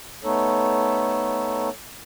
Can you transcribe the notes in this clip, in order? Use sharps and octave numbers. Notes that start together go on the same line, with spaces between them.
A3 B3 D#4 A4 C#5